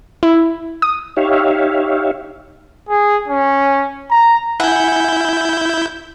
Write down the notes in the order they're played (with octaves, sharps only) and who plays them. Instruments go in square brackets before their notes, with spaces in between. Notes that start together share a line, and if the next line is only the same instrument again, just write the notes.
[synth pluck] E4
D#6
[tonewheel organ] D#4 G4 C#5 E5 F5
[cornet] G#4
C#4
A#5
[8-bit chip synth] E4 G6 [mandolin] F#5 G#5